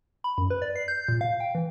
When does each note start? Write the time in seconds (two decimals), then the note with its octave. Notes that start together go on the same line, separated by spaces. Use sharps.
0.24 B5
0.38 F#2
0.50 B4
0.62 D5
0.76 C7
0.88 G6
1.08 A#2
1.21 F5
1.40 G5
1.55 E3